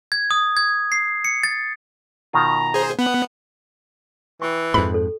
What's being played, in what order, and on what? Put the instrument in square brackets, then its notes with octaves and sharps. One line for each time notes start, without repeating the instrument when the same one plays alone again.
[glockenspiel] G#6
D#6
G#6
C7
C#7
A6
[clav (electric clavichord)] B2 D#3 F4 [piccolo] A#5
[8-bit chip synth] G#4 C5
[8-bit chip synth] B3 [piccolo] F#5
[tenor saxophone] E3 [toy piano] G5 C#6
[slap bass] F2 G#2 [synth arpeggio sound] B5
[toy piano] A4